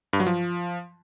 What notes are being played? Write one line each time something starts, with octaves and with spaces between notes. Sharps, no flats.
G2
F#3
F3